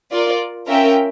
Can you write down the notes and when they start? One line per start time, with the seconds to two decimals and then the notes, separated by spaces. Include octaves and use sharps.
0.12 F4 A#4 D5
0.68 C#4 F4 A#4 E5 G5